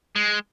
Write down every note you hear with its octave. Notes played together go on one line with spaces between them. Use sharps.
G#3